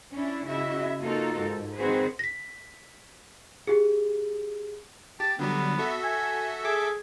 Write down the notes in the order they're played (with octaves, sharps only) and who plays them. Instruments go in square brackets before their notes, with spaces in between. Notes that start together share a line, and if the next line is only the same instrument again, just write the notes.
[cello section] C#4 D4 E4
C#3 E4 F#4 D#5 E5
A#3 D#4 F4 F#4 A4 A#4
G#2
D#3 C4 F#4 G#4 B4 C5
[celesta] A#6 B6
G4 G#4
[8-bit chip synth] G4 [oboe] A5
[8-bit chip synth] D3 F#3 G3 [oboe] B3
[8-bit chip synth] F#4 A4 E5
[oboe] G#5
[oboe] G#4 [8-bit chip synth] A4 E5 D6